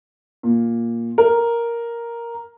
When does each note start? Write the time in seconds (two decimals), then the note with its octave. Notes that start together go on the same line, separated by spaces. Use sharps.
0.43 A#2
1.18 A#4